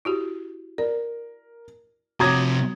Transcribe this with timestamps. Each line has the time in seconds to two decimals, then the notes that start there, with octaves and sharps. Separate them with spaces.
0.05 E4 F#4 G4
0.78 A#4 D5
2.20 C3 F3 F#4 C#5 A#5 D6 D#6 G#6